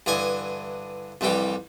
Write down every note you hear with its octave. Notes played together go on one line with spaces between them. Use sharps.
G2 D3 E3 D#5 G#5
C2 F2 E3 G3 G4